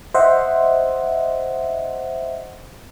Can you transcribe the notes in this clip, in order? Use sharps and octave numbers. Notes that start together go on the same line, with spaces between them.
C5 D#5 E5 F#5